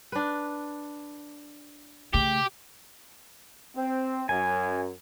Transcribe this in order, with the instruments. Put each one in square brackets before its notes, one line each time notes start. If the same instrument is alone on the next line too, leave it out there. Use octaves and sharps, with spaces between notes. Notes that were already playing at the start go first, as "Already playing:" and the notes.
[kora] D4 B4
[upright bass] C#3 A3 [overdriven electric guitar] G4
[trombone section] C4
[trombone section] F#2 [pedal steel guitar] G#5